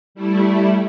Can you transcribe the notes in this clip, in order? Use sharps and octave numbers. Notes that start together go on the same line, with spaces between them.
G3 A3 E4